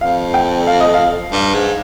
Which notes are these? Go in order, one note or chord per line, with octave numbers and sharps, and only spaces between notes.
F2 F5
G5
F5
D#5
F5
G2
G#2